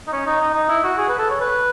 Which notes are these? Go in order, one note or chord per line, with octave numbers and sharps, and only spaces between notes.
D#4
C#4
D#4
D#4
D#4
E4
F#4
G#4
B4
A4
C#5
B4